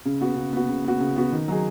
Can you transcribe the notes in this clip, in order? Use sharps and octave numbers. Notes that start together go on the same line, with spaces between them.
C#3
B3 F#4
C#3
B3 F#4
C#3
B3 F#4
C#3
B3 F#4
D#3
F#3 D#4 G#4